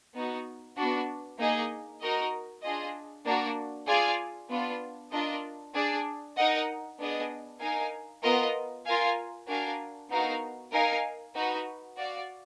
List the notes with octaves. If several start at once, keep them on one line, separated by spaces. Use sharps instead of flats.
B3 D#4 F#4
B3 D4 F#4
A#3 D#4 G#4 D#5
D#4 F#4 A#4 D#5
D4 F4 G#4 D#5
A#3 D4 F#4 A#4
F4 G#4 D5 F5 G#5
B3 D4 F4
D4 F4 A#4 D#5
D4 G#4 D5
D#4 A#4 D#5 F#5
B3 D4 G#4 D#5
D#4 A#4 F5 G#5
B3 F4 A#4 D#5
F4 A#4 F5 G#5
D4 F#4 A#4 F5 G#5
B3 D#4 F#4 A#4 F5
D#4 A#4 F5 G#5
D#4 F#4 B4
F#4 D5 F5